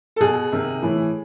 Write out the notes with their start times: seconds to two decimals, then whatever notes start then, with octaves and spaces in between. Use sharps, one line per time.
0.16 A4
0.20 B2 G#4
0.52 C3 D#3
0.82 A2 E3